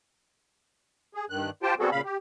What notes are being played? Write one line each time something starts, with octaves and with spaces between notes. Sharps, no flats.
G#4
G2 D#3 F#6
F4 G4 C5 G5 A5
G3 B3 C4 F#4 G#4 A4
A#2 C#3 F5 B5
G4